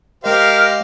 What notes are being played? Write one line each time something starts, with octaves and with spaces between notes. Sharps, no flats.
G#3 G4 A#4 C5 D#5 F5